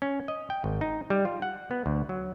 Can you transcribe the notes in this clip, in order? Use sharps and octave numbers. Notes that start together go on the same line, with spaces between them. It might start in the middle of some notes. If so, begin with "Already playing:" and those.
C#4
D#5
G5
G#1
D#4
G3
F4
F#5
B3
D2
F#3